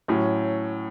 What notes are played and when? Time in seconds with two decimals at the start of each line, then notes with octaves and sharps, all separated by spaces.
0.08 A2 F#3 C#4